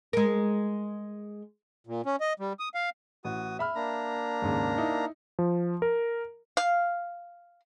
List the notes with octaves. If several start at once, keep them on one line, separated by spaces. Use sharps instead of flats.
G#3 A#4
A#2
C#4
D#5
G3
D#6
F5
A1 F#4 D#6
E5 B5 F6
A#3 D4 A#5
D#2 G#2 C#3
D#4 E4
F3
A#4
F5